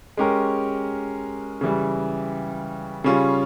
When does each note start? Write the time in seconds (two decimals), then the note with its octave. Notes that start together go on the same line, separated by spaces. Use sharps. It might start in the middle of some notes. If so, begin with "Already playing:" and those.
0.17 G#3 C#4 G4 A#4
1.61 C#3 E3 G3
3.04 C#3 G3 C#4 F4